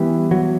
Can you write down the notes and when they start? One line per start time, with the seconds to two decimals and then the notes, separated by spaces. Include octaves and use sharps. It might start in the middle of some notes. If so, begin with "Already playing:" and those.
Already playing: E3 G3 B3 E4
0.31 F#3